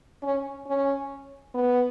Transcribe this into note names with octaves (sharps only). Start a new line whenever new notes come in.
C#4
C#4
B3